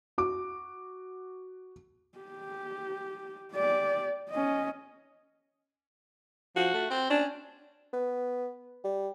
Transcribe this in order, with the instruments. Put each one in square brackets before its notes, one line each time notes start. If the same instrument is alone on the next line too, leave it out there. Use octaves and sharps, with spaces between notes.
[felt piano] F#4 D6
[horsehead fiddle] G4
G4 D5
C#4 D#5
[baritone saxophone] F3 [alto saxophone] F#4
[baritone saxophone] A3
C4
[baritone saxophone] C#4 [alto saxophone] D4
[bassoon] B3
G3